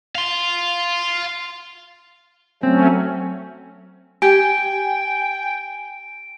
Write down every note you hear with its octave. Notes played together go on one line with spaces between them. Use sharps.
F5 C6
F#3 A3 C4 C#4
G4 G5 G#5 D7